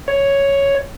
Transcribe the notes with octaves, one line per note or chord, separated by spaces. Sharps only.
C#5